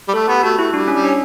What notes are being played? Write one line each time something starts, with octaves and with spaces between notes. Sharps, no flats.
G3
A3 A4
B3 G4
A3 F#4
A3 E4
G3 D4
C#4
G3
C#4 D4